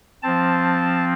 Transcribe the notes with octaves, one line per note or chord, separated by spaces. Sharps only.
F3 C4 A5